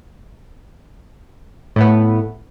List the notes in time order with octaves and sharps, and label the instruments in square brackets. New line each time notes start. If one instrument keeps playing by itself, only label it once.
[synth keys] A2 A3 B3